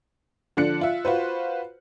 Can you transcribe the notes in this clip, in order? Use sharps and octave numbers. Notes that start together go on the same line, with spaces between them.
D3 F3 D4 F#6 C#7
F4 E5
F4 F#4 B4 C5